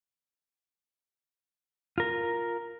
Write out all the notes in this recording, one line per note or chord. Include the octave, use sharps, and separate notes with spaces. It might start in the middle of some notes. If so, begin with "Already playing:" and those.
F4 A#4